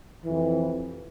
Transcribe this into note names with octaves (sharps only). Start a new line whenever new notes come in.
F2 C3 E3